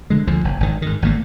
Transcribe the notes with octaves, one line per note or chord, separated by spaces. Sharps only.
D3 G#3
D2 D3 F3
F#1
G#1 D#3
G#2 D#3
G#1 D#3 A3 A#3